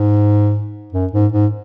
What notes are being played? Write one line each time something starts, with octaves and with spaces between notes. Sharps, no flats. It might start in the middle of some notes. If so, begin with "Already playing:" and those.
Already playing: G#2
F#2
G#2
G#2